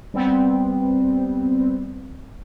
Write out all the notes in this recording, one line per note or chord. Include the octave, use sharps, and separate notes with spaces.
G3 B3 C4